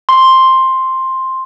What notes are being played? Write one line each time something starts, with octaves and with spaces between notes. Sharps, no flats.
C6